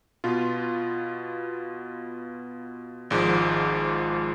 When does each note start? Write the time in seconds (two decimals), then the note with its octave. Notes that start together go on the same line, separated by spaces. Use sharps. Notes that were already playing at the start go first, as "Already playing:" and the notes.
0.24 B2 B3 F4
3.10 G#1 G#2 F3